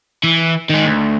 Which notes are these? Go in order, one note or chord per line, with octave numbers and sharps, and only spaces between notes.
E3
D#3 G#3
D2